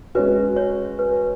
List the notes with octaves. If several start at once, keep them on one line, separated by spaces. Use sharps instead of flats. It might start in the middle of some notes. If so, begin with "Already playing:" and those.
G#3 C#4 F#4 B4
C#5
B4